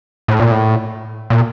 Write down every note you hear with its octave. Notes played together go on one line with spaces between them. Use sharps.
A2
A#2
A2
A#2